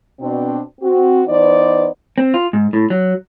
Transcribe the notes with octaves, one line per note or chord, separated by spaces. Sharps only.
B2 C4 D4
C4 F#4
E3 B3 D#4 C5 D5
C4
F4
G#2
A2
F#3